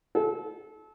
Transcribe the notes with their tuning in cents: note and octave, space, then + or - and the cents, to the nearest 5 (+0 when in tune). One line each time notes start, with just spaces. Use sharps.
A4 -30